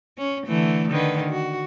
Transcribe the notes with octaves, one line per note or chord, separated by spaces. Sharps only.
C#4
D3 E3 A3
D3 D#3 B4
F#4